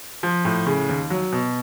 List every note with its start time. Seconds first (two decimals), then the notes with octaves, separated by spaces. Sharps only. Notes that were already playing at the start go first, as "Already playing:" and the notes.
0.23 F3
0.45 A2
0.67 C#3
0.89 D#2
1.10 F#3
1.32 B2